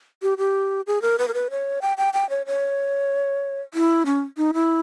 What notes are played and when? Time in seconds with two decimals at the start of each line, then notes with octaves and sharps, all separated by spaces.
0.22 G4
0.38 G4
0.87 G#4
1.02 A#4
1.19 B4
1.28 A#4
1.34 B4
1.51 C#5
1.82 G5
1.98 G5
2.14 G5
2.30 C#5
2.46 C#5
3.74 E4
4.06 C#4
4.37 D#4
4.54 E4